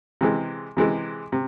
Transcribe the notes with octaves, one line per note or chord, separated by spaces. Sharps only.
C3 E3 G#3
C3 E3 G#3
C3